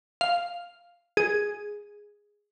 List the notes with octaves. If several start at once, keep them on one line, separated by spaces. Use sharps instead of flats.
F5
G#4